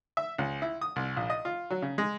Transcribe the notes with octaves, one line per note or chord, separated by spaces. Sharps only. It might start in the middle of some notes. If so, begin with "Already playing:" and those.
E5
C#2
E4
D#6
C2
A#1
D#5
F4
F#3
C#3
G#3